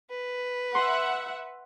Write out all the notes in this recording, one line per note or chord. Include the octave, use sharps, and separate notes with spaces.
B4
E5 F#5 C6